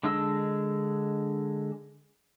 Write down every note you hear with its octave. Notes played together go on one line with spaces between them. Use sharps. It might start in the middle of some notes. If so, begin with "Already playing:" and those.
D3 G#3 D4 D#5 E6